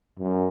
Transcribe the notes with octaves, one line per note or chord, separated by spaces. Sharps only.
F#2